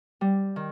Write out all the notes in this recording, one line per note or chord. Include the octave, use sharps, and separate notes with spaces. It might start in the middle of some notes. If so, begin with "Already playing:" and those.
G3
D#3